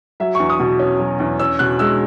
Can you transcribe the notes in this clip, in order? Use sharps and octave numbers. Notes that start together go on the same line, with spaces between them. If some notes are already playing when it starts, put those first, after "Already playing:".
F#3 E5
E2 C#6
D#6
B2
C#4
F#3
E2
C#4 E6
B2 F#6
G#3 E6